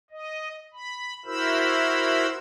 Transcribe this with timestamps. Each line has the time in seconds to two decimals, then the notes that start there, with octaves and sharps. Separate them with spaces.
0.11 D#5
0.73 B5
1.25 E4 F#4 A#4 C5 B5 E6